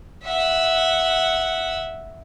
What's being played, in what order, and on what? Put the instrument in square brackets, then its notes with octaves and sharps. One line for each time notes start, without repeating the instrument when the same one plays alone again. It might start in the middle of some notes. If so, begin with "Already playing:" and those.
[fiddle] E5 F#5